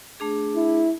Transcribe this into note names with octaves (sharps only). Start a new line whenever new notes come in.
A3 D4 G#4
E4